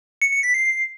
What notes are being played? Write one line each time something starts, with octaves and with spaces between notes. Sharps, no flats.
C#7
C#7
B6
C7